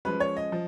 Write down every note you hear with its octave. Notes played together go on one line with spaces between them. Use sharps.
F3 G#3 C#4 B4
C#5
D#5
F3